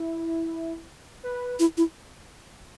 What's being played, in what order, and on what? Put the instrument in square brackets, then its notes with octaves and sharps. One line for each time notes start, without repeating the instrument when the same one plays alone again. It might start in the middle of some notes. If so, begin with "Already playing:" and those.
Already playing: [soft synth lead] E4
B4
[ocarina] E4
E4